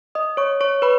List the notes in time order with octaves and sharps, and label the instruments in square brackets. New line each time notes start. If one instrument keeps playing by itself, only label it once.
[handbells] D#5 D#6
C#5 C#6
C#5 C#6
B4 B5